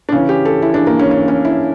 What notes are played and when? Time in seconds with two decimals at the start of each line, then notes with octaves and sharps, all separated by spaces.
0.09 D4
0.12 C#3 E3 C#4
0.29 G4
0.45 A4
0.62 E4
0.74 D4
0.87 A#3
0.99 C#4
1.11 C#4
1.28 C#4
1.45 E4